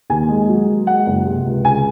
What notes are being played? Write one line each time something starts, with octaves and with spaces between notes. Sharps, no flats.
D#2 G#5
G#3
F#3
F#3
G#3 F#5
F#1
C3
C#2
C#3 G#5